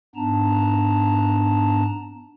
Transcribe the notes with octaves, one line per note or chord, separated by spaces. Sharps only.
G#2 B3 D4 A5 A#5